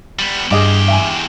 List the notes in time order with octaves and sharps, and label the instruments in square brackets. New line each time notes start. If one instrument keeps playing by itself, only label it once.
[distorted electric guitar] G3 B3
[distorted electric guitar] E2 G4 [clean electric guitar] G2 [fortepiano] G#4 D#5 D6
[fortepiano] E5 G5 G#5